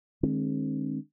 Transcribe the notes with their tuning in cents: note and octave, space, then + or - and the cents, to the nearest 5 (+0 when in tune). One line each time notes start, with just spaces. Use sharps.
D#3 -40 G#3 +0 C4 +30